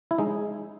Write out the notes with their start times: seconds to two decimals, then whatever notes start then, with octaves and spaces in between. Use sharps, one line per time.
0.11 E4
0.18 G#3 D#4